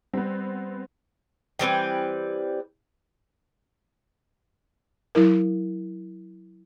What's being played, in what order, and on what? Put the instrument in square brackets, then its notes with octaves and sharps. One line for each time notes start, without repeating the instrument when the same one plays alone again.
[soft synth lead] G3 [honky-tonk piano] B3 C4
[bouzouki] E3 G3 C4 B4
[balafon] F#3 E4 A#4